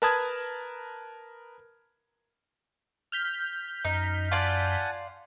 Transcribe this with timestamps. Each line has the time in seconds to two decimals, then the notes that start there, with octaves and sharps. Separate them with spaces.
0.02 A#4 B4 A5 B5 D#6 G#6
3.12 F6 G6 B6
3.85 F#2 D#4
4.32 F4 D5 F#5 G#5 A5